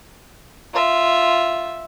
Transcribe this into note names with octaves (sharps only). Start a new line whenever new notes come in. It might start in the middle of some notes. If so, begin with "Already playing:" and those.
F4 E5